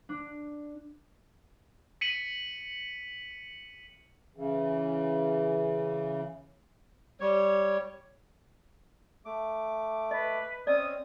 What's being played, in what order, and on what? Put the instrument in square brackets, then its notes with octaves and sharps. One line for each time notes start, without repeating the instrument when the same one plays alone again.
[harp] D4
[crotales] B6 C#7 D#7 F#7
[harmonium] C#3 E3
[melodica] G3 C#5
[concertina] A3 D6
[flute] B4 [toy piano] D#5
[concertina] C4 C#4 [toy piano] D5 D#5 [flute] D#6